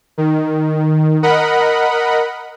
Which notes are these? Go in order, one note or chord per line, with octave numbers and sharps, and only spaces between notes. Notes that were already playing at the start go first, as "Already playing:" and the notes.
D#3
A#4 D#5 F#5 B5